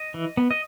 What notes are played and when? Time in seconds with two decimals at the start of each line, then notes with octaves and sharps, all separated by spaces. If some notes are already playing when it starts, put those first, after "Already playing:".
Already playing: D#5
0.14 E3
0.37 B3
0.51 D#5